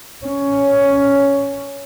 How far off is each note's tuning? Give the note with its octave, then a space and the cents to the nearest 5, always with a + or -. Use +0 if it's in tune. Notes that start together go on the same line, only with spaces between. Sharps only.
C#4 +10